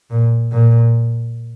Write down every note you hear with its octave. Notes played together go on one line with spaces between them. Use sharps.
A#2
A#2